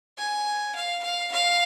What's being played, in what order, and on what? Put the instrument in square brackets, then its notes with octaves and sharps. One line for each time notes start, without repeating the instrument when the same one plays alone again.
[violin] G#5
F5
F5
F5